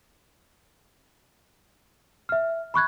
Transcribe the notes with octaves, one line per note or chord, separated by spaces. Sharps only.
E5 F6
B5 C#6 F#6 G#6